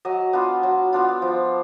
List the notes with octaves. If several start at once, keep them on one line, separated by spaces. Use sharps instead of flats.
F#3 D#5
B3 D4 F4
F#3
B3 D4 F4
F3